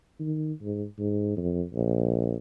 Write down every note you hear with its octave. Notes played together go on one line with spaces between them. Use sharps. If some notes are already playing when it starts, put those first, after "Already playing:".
D#3
G#2
G#2
F2
A#1